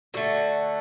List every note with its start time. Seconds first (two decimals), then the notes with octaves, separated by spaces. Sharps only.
0.14 D3 A3 F#4